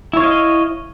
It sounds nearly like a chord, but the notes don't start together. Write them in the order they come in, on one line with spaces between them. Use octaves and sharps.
E4 C#5 F5 D#5